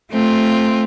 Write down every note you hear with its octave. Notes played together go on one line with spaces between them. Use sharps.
A3 C4 F4